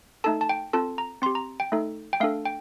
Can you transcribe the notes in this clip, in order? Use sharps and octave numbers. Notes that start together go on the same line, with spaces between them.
A3 D#4 A4 A5
A5
G5
C4 F4 A4 A5
A#5
C4 G4 C6
A#5
G5
A3 D#4 A4
G5
A3 D4 A4 F5
G5